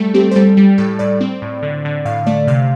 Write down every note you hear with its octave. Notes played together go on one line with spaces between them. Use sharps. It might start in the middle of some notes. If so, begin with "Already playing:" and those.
Already playing: G3 A3 A4
C4 G4
C5
G3 A4
G3 G4
A2 A4
A2 D5
C4
A2
D3
D3
A2 F5
A3 D5
C3 F5